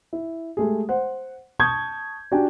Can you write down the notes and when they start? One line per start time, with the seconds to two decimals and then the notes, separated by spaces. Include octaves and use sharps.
0.13 E4
0.57 G#3 A3 G4 G#4
0.89 C5 F#5
1.59 A5 C#6 D#6 G6 G#6
2.32 D4 F#4 G4 G5 G#5